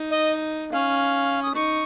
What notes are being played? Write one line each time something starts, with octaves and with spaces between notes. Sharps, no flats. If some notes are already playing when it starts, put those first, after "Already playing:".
Already playing: D#4
D#5
C#4 F5
D#6
D#4 C#6